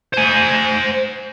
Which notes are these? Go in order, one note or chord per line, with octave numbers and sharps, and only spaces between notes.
C5 G#5